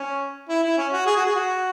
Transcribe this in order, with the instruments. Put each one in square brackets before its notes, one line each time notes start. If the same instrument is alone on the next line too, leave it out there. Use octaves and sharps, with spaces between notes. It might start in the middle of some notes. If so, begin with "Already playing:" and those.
Already playing: [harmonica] C#4
E4
E4
C#4
F#4
G#4
F#4
G#4
F#4